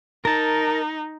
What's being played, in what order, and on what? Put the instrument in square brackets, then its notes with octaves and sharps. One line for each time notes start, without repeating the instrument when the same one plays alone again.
[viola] D#4 [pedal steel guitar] A#4 A5